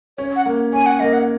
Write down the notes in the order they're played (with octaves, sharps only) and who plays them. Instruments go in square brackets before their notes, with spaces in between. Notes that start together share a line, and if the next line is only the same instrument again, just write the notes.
[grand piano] C#4 [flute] C#5
[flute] F#5
[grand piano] A#3
[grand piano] C#4 [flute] G#5
[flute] F#5
[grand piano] A#3 [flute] D#5
[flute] F#5